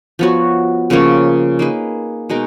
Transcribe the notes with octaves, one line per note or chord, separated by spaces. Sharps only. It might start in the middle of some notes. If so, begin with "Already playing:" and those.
F3 B3 F#4 C#5
C#3 F3 A#3 C#4
A#3 D#4 G#4 B4
B2 G#3 D#4 A#4